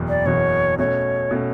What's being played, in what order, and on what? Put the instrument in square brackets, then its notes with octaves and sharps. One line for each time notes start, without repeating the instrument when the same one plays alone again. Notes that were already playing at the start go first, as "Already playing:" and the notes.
Already playing: [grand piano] F#1 E2 B2
[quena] D5
[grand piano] F#1 E2 B2 [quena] C#5
[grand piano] B2 A3 C#4 [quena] C#5
[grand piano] B2 A3 C#4